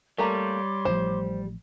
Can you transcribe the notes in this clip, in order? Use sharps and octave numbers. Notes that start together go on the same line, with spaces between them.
G3 A3 A#3 C#5 A#5 C6 D6
A1 A2 F3 C5